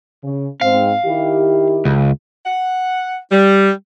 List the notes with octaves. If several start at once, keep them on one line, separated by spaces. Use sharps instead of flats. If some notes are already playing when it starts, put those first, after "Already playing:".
C#3
G#2 C4 F5
D#3 E4 G4
C#2
F#5
G3